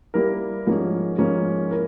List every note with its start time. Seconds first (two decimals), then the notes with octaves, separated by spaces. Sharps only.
0.14 G3 A#3 E4 A#4
0.67 G#2 F3 A#3 C#4
1.18 G#2 F3 A#3 C#4
1.71 E4 A#4